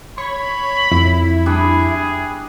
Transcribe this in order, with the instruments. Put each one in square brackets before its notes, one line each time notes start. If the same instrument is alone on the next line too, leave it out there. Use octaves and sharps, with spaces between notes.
[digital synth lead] C#5 [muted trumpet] B5
[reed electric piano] F2 [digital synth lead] E4
[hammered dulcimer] G3 D4 G4 [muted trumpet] G#4